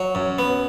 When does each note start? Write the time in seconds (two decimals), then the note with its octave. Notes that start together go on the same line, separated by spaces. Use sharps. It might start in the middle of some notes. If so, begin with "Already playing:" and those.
Already playing: F#3
0.15 F#2
0.39 B3